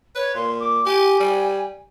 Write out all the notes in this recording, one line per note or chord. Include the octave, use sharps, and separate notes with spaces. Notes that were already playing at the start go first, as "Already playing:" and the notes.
B4 C#5
A#2 C6
D6
G4 G#5
G3